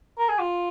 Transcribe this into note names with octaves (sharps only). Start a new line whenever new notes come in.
A#4
G#4
F4